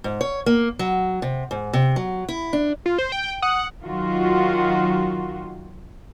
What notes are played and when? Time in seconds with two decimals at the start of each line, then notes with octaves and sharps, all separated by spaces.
0.04 G#2
0.21 C#5
0.46 A#3
0.79 F#3
1.22 C3
1.51 G#2
1.73 C3
1.96 F#3
2.28 E4
2.53 D4
2.86 F4
2.98 C5
3.12 G5
3.42 F#5 D#6
3.84 D#3 F#3 F4 F#4